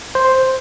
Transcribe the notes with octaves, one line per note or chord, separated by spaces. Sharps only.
C5